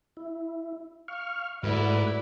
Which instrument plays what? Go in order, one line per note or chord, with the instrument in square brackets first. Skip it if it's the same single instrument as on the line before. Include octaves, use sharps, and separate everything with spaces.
[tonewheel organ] E4
F5 C#6 F6
[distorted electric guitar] G#2 [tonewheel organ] A3 F#4 B4 [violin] E4 D5